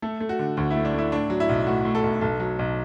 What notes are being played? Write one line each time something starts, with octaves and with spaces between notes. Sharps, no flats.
A3 A4
A3
F#4
D3
D2 F#4
E4
A3
D4
A3 E4
A2 D4
F#3
E4
B1
A2 F#4
A2
A4
B1
B1 A4
F#3
B1